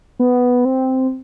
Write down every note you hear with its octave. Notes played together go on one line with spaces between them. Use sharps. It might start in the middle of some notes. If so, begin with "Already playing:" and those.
B3
C4